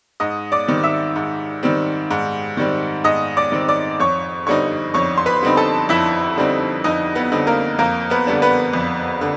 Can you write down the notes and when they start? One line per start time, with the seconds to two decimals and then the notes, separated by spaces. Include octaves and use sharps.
0.20 G#2 D#5 D#6
0.52 D5 D6
0.68 D#3 G3 C4
0.83 E5 E6
1.16 G#2
1.63 D#3 G3 C4
2.11 G#2
2.57 D#3 G3 C4
3.04 G#2 D#5 D#6
3.37 D5 D6
3.52 D#3 G3 C4
3.68 D5 D6
4.00 F2 C#5 C#6
4.47 D3 G3 C4 D#4 C#5 C#6
4.94 F2 C#5 C#6
5.18 C6
5.26 B4 B5
5.43 D3 G3 C4 D#4
5.57 A4 A5
5.89 F2 E4 E5
6.37 D3 G3 C4 D#4
6.84 F2 D#4 D#5
7.15 B3 B4
7.32 D3 G3 C4 D#4
7.47 A#3 A#4
7.79 F2 A#3 A#4
8.10 B3 B4
8.27 D3 G3 B3 D4
8.42 B3 B4
8.73 F2
9.21 D3